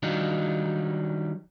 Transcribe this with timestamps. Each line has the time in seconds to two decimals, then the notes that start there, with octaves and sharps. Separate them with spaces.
0.03 D#3 F#3 G3 D4 D#4 F4